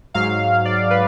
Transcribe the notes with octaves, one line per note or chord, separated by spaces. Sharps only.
G#2 F#3 F5
D5
B4